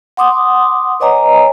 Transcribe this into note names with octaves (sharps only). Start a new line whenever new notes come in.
F#5 C6 D6 D#6
B4 C#5 D#5 G#5 A#5